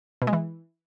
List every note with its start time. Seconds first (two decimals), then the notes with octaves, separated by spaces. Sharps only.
0.22 B2
0.27 G#3
0.33 E3